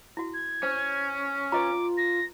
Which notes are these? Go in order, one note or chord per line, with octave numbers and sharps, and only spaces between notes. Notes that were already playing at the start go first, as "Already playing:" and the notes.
E4 F#4
G#6
C#4 C5
F4 B4 D#5 A#5 D6
A#6